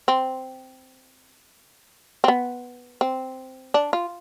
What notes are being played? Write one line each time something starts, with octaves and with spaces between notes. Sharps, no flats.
C4
C4
B3
C4
D4
F4